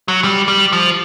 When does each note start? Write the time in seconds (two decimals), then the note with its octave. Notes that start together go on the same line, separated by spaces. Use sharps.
0.08 F#3
0.24 G3
0.48 G3
0.72 F3